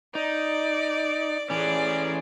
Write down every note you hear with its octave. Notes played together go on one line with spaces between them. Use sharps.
D#4 D5
E3 C#4 G#4 D5